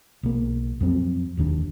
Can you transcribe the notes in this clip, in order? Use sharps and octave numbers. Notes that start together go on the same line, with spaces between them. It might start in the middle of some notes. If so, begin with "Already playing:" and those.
B1 A#3
F2 F#3 C4
F1 D#2 D#3 D4